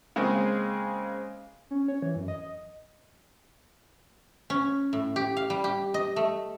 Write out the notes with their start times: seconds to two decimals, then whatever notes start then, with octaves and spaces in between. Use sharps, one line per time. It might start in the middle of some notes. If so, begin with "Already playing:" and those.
0.16 C#3 G#3 A#3 C4
1.71 C#4
1.88 C#5
2.02 E3
2.16 F#2
2.28 D#5
4.50 C#4
4.93 A2
5.16 G4
5.37 F5
5.50 G3
5.64 G4
5.94 D#5
6.16 A3